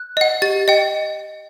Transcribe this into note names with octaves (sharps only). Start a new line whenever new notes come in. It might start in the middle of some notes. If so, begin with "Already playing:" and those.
Already playing: F#6
D#5 F#5
G4 A6
D#5 G5